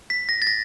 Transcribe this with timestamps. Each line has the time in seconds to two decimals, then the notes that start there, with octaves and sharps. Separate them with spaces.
0.10 B6
0.29 A#6
0.42 A6
0.47 A#6